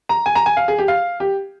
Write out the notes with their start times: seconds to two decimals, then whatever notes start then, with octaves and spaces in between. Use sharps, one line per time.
0.09 A#5
0.26 G#5
0.35 A#5
0.46 G#5
0.57 F5
0.68 G#4
0.78 G4
0.88 F5
1.20 G4